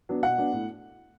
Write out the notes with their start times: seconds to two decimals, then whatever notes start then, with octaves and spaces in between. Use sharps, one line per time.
0.09 F#3 B3 D4
0.23 B2 F#5
0.38 F#3 B3 D4
0.53 A2